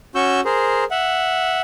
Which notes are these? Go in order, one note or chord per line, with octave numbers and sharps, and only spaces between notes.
C#4 F#4 C#6 E6 G6
G#4 A#4 C5
E5 F#5